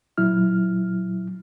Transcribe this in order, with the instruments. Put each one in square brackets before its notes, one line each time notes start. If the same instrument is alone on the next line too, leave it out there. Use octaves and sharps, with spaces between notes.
[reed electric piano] A#2 F#3 E4 F6